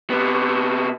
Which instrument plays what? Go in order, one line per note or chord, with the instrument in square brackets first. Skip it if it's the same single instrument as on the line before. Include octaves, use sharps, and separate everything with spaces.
[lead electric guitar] C3 B3